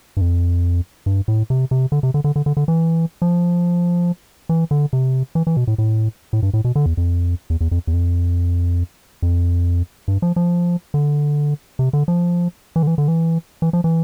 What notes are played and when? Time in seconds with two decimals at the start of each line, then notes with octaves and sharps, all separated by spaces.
0.17 G2
0.21 F2
1.06 G2
1.28 A2
1.50 C3
1.71 C3
1.92 D3
2.03 C3
2.14 D3
2.24 D3
2.36 D3
2.46 D3
2.57 D3
2.68 E3
3.22 F3
4.49 E3
4.71 D3
4.93 C3
5.35 E3
5.47 E3
5.57 B2
5.67 A2
5.78 A2
6.33 A2
6.43 G2
6.54 A2
6.64 B2
6.76 D3
6.86 E2
6.97 F2
7.50 E2
7.61 E2
7.71 F2
7.87 E2
7.93 F2
9.22 F2
10.08 G2
10.22 F3
10.36 F3
10.94 D3
11.79 C3
11.93 D3
12.08 F3
12.76 E3
12.83 D3
12.87 E3
12.98 D3
13.08 E3
13.62 E3
13.73 F3
13.84 E3